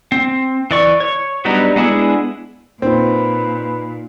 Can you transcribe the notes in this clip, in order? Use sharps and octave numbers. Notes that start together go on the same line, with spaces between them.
C4
E3 D5 C#6
C#5
F#3 G3 B3 D4 D#4
G#3 B3 D4 E4 G#4
A#2 A#3 C4 D#4 F4 B4